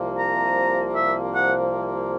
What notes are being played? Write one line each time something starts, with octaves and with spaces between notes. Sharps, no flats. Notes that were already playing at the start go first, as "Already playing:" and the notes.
Already playing: C2 C3 F3 A#3
A#5
E5
F#5